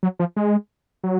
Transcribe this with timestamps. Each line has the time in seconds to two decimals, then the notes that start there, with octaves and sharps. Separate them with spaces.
0.03 F#3
0.19 F3
0.36 G#3
1.03 F#3